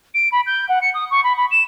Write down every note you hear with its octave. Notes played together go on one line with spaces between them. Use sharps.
D7
B5
G6
F#5
C#7
D#6
C#6
B5
B5
E7